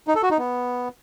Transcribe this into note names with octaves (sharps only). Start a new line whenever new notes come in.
D#4
A4
F#4
D#4
B3